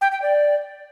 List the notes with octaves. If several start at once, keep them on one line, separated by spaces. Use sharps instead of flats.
G5
G5
D5